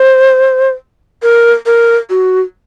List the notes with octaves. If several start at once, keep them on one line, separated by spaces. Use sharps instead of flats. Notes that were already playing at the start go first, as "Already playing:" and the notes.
Already playing: C5
A#4
A#4
F#4